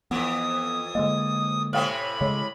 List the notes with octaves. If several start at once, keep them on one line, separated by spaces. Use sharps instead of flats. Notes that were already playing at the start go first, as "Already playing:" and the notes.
F2 E3 B3 D#6
D3 G#3 A#3 D#5 E6
A2 C3 C#4 C5 F5 G5 B5
C#3 G#3 C#5